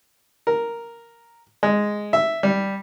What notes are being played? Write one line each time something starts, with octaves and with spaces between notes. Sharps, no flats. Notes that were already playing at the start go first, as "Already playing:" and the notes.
A#4
G#3
E5
G3